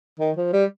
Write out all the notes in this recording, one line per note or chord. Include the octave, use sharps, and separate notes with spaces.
D#3
F3
G3